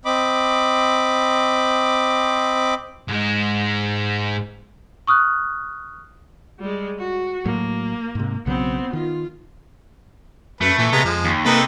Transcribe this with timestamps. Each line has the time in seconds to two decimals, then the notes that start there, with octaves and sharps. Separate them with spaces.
0.05 C4 D#5 B5 D6
3.09 G#2 G#3
5.07 C#6 D#6 F6 F#6
6.60 G3 G#3
6.98 F#4
7.45 A2 F#3 A#3
8.15 G#2 C3
8.46 B1 C#3 F#3 B3 C4
8.93 D#3 F4
10.61 F#2 A3 B4
10.78 A#2 E3
10.92 C3 G#3 B3 A#5
11.05 F2 F3 G#3
11.25 D#2
11.46 C3 A#3 D#4 A4 B4